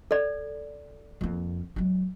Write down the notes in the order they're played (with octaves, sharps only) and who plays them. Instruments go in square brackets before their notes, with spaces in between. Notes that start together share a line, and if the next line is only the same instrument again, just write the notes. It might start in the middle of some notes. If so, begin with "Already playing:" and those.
[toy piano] A4 D5
[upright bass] F2 A#3
F#3 G#3